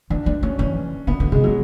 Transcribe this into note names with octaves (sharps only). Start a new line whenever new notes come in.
E3 D4
G#3 D4
G#3 C#4
E3 C#4
D3 B3
D3
C#3 G#3
E3 F#3